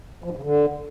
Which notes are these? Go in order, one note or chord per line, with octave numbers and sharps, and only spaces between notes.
F3
G#2
C#3
D3